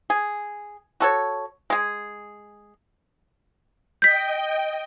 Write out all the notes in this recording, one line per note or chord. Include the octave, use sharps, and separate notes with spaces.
G#4
F#4 A4 C#5
G#3 G#4
D#5 G5 G6 B6